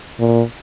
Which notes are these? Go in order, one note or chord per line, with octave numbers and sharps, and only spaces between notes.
A#2